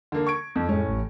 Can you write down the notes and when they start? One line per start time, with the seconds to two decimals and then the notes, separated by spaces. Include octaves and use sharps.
0.12 D3 A#3
0.27 C#6 G#6 D7
0.56 F2
0.69 A2 G#3 C#4
0.88 A1